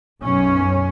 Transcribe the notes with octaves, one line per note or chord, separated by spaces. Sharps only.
B1 F#2 C#4